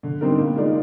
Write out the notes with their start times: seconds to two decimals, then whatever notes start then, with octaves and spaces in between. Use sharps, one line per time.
0.03 D3
0.21 G3 C4 D#4 A#4
0.38 A#2
0.55 G#3 D#4 A#4 D5